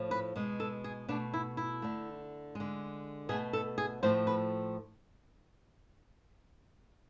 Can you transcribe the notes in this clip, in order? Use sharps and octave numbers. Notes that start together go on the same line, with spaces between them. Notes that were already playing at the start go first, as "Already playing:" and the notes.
Already playing: A2 F3 A3
B4
B2 G#3
A4
G#4
B2 A3 D4
E4
E4
D3 A3
D3 G#3
B2 A3 G#4
A4
G#4
A2 F3 A3 C5
B4